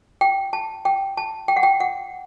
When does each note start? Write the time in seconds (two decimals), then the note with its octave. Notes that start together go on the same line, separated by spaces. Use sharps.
0.21 G5
0.53 A5
0.85 G5
1.17 A5
1.48 G5
1.56 F#5
1.63 G5
1.80 F#5